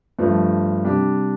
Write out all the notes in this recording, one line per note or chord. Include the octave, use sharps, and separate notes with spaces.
G2 F3 A3
C3 G3 D4 G4